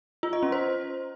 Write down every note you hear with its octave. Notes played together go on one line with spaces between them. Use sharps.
F4
D#5
C#4
C5